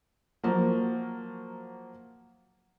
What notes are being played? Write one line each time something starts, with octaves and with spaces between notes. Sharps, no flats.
F3 F#3 A#3